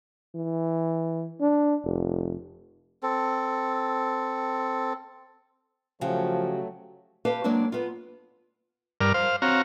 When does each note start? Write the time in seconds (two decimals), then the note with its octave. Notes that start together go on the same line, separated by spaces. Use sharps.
0.35 E3
1.41 D4
1.85 F1
3.03 C4 A4
6.01 C#3 F3 F#3 A3 F#4 G4
7.25 G4 B4 F5 A5
7.44 F#3 G#3 A#3 C4 D4
7.72 B3 F4
9.01 G2 A#4 D5 F6
9.14 C5 F5
9.42 C4 F#4 C#5 F5 A#5